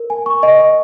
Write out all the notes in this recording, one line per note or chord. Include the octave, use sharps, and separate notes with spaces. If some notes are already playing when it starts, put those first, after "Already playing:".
Already playing: A#4
G#5
C#6
D#5
D#5